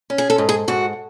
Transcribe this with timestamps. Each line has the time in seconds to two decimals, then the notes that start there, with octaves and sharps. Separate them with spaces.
0.10 C#4
0.18 G#4
0.30 A4
0.38 G#2
0.49 G#4
0.68 G#2 F#4